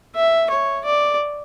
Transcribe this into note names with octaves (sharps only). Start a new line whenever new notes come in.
E5
C#5
D5